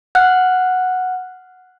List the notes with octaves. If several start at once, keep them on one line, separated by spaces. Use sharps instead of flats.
F#5 F6 F#6